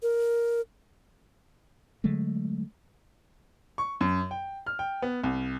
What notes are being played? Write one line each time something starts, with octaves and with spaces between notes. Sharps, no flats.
A#4
D3 F#3 G#3 A3
C#6
F#2
G5
F6
G5
B3
C2